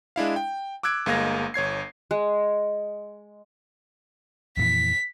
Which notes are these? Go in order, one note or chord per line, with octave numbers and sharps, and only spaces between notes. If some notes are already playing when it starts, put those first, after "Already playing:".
G#3 D4 E4 F5
G5
D6 E6 F#6 G#6 D7
G1 G#3 A#3 F5 G#6 A#6
G1 C#5 G#6 C7
G#3
F2 A#2 E3 B6